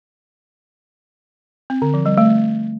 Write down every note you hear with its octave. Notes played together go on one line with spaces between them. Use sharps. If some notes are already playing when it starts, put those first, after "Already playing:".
C4
D3
F3
G3
A3